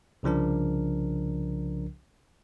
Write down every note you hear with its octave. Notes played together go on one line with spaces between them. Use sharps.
C2 C#3 F3 D4 A#4